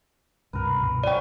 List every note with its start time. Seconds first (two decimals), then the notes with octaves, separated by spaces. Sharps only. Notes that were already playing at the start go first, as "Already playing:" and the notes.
0.53 C#2 G2 C3 A#4 B4
0.80 C#2 G2 B2
1.04 F3 C#4 D5 G5